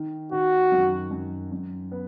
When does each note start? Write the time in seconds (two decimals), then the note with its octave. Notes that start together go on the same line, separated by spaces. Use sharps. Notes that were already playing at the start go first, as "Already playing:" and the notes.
Already playing: D#3
0.32 D#3 F#4
0.72 F#2
1.11 F#2
1.52 F#2
1.92 B3